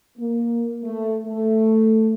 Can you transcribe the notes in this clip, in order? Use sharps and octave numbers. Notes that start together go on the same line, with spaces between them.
A#3
A3
A3